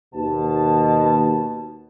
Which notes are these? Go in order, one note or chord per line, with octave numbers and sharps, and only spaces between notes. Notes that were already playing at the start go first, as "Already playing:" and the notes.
D#2 B2 A5